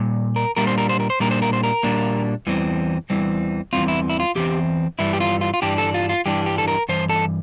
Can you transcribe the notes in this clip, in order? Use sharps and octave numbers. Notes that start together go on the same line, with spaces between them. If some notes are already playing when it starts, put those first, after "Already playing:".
Already playing: A#2 G3
A#4
A#2 G3 A#3 D4 A#4
C5
A#4
C5
A#4
C5
A#2 G3 A#3 D4 A#4
C5
A#4
C5
A#4
A#2 G3 A#3 D4
E2 E3 G3 C4
E2 E3 G3 C4
E2 E3 G3 C4 F4
E4
E4
F4
E2 E3 C4 G4
G2 E3 G3 E4
G4
F4
F4
F4
G2 E3 G3 D4 G4
A4
F4
F4
G2 E3 G3 D4 G4
G4
A4
A#4
G2 E3 C5
A4